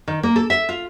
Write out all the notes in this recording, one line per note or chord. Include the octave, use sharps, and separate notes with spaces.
D#3
A#3
A4
E5
F4